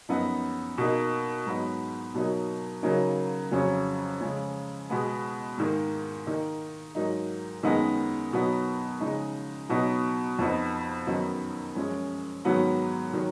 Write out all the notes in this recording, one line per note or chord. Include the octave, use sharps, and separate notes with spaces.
F#2 F3 B3 D#4
B2 A#3 D#4
G#2 F#3 B3 D#4
B2 F#3 A#3 D#4
C#3 F#3 A#3 D#4
F2 C#3 F#3 C#4
C#3 F3 G#3
B2 G#3 B3
G#2 D#3 A#3
D#3 A#3 D#4
G#2 F#3 A#3 D#4
F#2 D#3 G#3 B3 D#4
B2 F#3 B3 D#4
C#3 F3 G#3 D#4
B2 F#3 B3 D#4
F2 F3 B3 D#4
F#2 D#3 F#3 B3 D#4
F#2 F3 G#3 C#4
G#2 D#3 F#3 B3
D#3 F#3